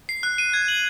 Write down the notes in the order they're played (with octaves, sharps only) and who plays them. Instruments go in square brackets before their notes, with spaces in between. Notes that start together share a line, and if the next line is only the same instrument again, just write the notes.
[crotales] C7
F#6
D#7
G#6
F#7